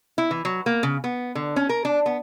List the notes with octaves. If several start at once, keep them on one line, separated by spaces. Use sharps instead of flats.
E4
E3
F#3
A#3
C#3
B3
D3
C#4
A#4
D4
B3